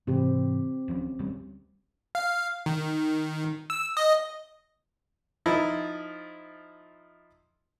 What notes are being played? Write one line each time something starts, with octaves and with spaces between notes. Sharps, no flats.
G#2 C3 E3 C4 G4
D1 F3 C#4
D1 G3 C#4
F5
D#3
E6
D#5
F3 D#4 E4